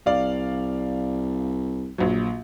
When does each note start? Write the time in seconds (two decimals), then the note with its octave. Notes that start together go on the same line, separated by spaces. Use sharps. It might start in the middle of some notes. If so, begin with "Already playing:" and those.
0.06 C2 D5 F5
1.98 A#1 F#3